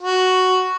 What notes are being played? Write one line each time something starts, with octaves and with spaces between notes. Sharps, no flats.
F#4